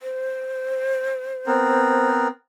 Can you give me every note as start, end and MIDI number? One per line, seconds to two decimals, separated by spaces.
0.01 2.14 72
1.47 2.28 59
1.47 2.28 60
1.47 2.28 70